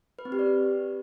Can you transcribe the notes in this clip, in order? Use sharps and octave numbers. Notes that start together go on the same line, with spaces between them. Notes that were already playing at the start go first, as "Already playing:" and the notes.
B4
C4
G4
D5